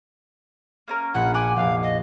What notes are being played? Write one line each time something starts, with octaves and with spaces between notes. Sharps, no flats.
A#3 C#4 A#4
A#1 A#2 F#5 B5
F#5 G#5 D6
F1 A#1 F5
D#5